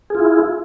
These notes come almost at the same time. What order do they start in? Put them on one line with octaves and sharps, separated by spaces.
G#4 F4 E4